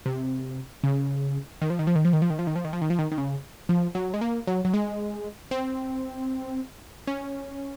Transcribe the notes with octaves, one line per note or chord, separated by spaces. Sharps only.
C3
C#3
D#3
F3
D#3
F3
D#3
F3
D#3
F3
D#3
F3
D#3
F3
D#3
F3
D#3
F3
D#3
D#3
C#3
F3
F#3
G#3
A#3
F#3
F#3
G#3
C4
C#4